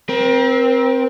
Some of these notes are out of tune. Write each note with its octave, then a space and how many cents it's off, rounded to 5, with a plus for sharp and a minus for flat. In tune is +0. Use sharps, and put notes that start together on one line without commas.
C4 +0 A#4 +40